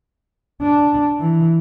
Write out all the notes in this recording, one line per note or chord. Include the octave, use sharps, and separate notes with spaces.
D4
E3